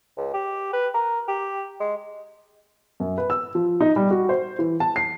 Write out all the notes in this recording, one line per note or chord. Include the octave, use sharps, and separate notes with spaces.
C#2
G4
B4
A#4
G4
G#3
F#2
B4
E6
F3
D#4
G3
F#4
C5
E3
A5
C7